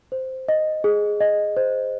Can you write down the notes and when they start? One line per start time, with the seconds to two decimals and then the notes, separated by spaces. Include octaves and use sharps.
0.12 C5
0.48 D#5
0.84 G#4
1.21 D#5
1.57 C5